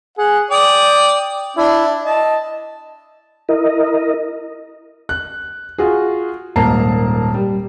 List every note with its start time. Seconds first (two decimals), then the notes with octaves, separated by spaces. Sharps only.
0.18 G#4 F#5
0.51 D5 G5 D#6
1.57 D4 E4
2.04 D#5 A5
3.49 E4 A#4 D#5
5.09 F#6
5.78 F4 F#4 G#4
6.56 D#1 G#2 A#3 A5 A#5 C7
7.34 G3